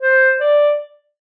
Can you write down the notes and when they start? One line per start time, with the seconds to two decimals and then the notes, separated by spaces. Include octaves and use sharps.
0.01 C5
0.40 D5